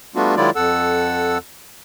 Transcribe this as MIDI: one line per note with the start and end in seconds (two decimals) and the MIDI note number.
0.16 0.35 55
0.16 0.35 57
0.16 0.35 59
0.16 0.35 62
0.16 0.35 65
0.16 0.35 66
0.37 0.50 51
0.37 0.50 54
0.37 0.50 56
0.37 0.50 64
0.37 0.50 65
0.37 0.50 74
0.56 1.38 41
0.56 1.38 69
0.56 1.38 78
0.56 1.38 88